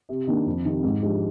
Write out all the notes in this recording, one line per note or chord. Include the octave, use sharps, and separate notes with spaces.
C3
D#3 A#3 D4
F2
C3 D#3
G#2
F3 G#3 D4 G4